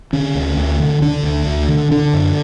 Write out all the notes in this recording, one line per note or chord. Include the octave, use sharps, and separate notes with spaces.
D3 C#4
D2
D2
D3
D3 D4
D2
D2
D3
D3 D4
F#2